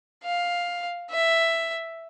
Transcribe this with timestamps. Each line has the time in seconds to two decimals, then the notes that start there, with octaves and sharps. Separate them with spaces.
0.24 F5
1.11 E5